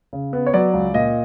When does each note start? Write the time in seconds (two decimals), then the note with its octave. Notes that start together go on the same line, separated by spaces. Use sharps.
0.13 C#3
0.33 B3
0.47 C#5
0.54 F#3 D5
0.73 C#2
0.94 A#2 D#5